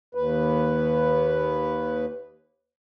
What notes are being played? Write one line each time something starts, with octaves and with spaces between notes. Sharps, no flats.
D#2 B4